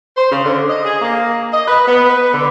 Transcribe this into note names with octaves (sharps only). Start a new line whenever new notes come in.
C5
C#3
D3
D#5
G#4
A#3
D#5
B4
B3
B4
D3